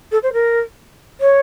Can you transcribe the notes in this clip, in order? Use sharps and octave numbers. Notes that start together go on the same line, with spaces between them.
A4
C5
A#4
C#5